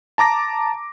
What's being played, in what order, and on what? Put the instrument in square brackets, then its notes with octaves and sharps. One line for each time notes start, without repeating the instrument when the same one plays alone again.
[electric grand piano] A5 A#5 D6 A#6